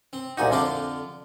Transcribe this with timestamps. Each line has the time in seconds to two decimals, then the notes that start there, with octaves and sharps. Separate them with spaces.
0.13 C4
0.37 C2 A#2 D#4 F#4 G#5
0.52 F2 D3 F4 D5